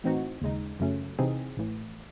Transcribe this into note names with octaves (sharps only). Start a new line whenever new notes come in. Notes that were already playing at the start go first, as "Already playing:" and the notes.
A2 E3 C4 D#4 F#4
D#2 C#3 G#3 D#4
F#2 C#3 F#3 A3 C#4
C3 E3 C4 D#4 G#4
A1 A2 E3